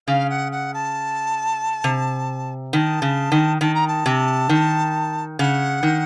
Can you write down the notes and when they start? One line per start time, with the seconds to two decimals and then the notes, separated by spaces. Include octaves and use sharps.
0.07 C#3 F5
0.29 F#5
0.51 F#5
0.73 A5
1.84 C3
2.73 D#3 A5
3.02 C#3
3.32 D#3
3.61 D#3 A5
3.74 A#5
3.87 A5
4.06 C3
4.49 D#3
5.39 C#3 F#5
5.83 D#3